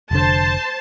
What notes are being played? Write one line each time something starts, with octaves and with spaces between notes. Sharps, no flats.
F1 D3 C5 A5